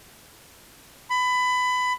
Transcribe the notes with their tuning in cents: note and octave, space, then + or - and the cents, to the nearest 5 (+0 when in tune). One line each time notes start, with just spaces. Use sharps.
B5 +20